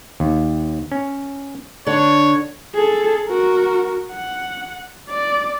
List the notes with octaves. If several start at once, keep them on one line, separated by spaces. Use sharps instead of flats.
D#2
C#4
D3 D4 C#5
G#4 A4
F#4 A#4
F#5
D5